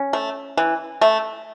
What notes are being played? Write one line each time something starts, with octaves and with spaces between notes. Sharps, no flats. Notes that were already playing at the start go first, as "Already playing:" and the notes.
Already playing: C#4
A3
E3
A3